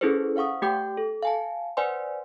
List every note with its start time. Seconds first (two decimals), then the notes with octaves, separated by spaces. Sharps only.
0.01 C#4 E4 G#4 A4 B4 C5
0.36 C5 F5 F#5 C#6 D#6
0.62 A3 G4 G5 D6 G6
0.97 A4
1.23 F5 G#5 A5
1.77 B4 C5 D5 F#5 G#5 C6